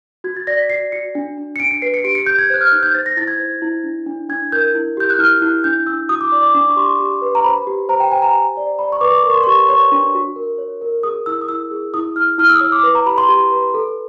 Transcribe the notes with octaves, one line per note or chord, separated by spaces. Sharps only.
F#4 G#6
A6
D5 A#6
B6
F#4 C7
F#4 C#7
D4
D4
C#7
D4 D7
C#7
B4 C7
C#7
G4 D7
C#7
G4 G6
G#6
C5 F#6
F6
D#4 F#6
G6
C5 A6
A#6
E4 A6
G#6
C5
E4
D4
D4
D4 G#6
A#4 G6
E4
G4 G6
F#6
E4 F6
E4 F#6
D4 G6
D4 E6
F#4 D#6
D6
D5 D6
D6
D4 D6
C#6
G4 C6
G4
B4
A#5
C5 B5
G4
C5 A#5
G5
C5 G#5
A#5
G4
D5
D5 B5
C#6
B4 D6
A#4 C#6
C6
C#6
G4
C#5 C#6
D4
F#4
A#4
C#5
A#4
G#4 D#6
E4 E6
D#6
E4 E6
G#4
E4 D#6
E4 F6
E4 F6
E6
D#6
C#5 E6
D6
B4
A#5
G4 B5
C6
G4
B4
A4